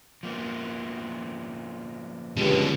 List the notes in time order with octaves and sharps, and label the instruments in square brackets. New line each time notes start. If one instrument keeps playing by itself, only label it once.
[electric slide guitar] F3 A#3 B3
[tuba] C#2 [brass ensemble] G2 [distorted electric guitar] B2 D3